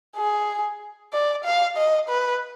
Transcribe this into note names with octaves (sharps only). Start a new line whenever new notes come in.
G#4
D5
F5
D#5
B4